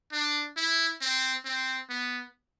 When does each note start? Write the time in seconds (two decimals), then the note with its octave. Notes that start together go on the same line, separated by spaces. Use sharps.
0.12 D4
0.57 E4
1.01 C4
1.45 C4
1.89 B3